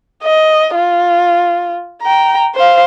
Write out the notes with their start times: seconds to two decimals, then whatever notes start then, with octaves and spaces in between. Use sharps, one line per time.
0.23 D#5
0.75 F4
2.02 G5 A#5
2.55 C5 F5